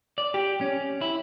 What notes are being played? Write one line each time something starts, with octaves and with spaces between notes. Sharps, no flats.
D5
G4
C#4
E4